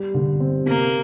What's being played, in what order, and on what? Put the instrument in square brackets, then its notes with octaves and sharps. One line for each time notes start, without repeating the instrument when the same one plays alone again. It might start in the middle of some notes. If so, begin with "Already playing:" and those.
Already playing: [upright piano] G3
D3
C4
[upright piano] C3 [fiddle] A#3